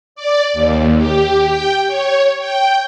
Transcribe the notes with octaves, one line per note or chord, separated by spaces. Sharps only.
D5
D#2
G4
G5
C#5
G5